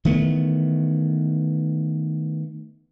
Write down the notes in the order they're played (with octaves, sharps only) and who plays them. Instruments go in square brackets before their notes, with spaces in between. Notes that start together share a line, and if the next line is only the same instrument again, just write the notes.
[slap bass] D#3 E3 A3 B3